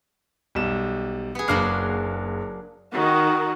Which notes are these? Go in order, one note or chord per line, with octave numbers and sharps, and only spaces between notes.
B1 G3 E7
B3 G#4
F#1 F#3 A#3 D4 F6 C7
D#3 F#4